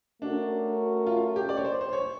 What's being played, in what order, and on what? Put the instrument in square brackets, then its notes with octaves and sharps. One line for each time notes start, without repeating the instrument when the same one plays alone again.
[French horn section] A3 C#4 F#4 A#4 [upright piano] D4
[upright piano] F4
G4
D5
C#5
C5
C5
C#5